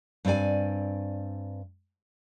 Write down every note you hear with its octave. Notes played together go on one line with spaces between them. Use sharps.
G2 C4 F#4 D5 G#5